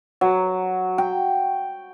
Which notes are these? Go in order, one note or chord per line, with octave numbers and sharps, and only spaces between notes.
F#3
G5